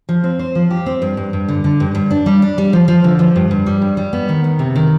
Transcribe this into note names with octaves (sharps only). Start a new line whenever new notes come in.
F3
C4
C5
F3
G4
C4
G2
G2
G2
D3
D3
G2
G2
D4
G3
D4
G3
F3
F3
D3
F3
G2
G2
G3
G2
G3
B3
D#3
B3
C3
D#3